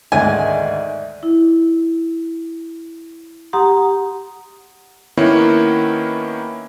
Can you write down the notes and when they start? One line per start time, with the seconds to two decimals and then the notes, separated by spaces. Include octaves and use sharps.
0.12 D2 G#2 D#3 D5 E5 G#5
1.23 E4
3.53 G4 F#5 A#5 C6 D#6
5.17 D#3 A#3 B3 C#4 E4